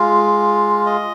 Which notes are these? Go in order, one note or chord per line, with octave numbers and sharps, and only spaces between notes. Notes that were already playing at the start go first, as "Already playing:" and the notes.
Already playing: G#3 F4
D#5